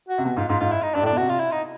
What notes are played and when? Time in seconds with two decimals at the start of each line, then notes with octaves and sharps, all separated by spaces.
0.09 F#4
0.18 C3
0.25 B2 F#4
0.36 G#2 F4
0.48 G#2 F4
0.60 G#2 F4
0.72 E4
0.83 D#4
0.94 G2 D4
1.03 A2
1.06 D4
1.12 B2
1.17 C3 F#4
1.29 F4
1.40 E4
1.52 D#4